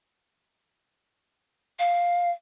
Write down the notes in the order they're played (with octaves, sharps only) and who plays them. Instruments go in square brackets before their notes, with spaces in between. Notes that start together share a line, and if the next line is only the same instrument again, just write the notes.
[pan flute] F5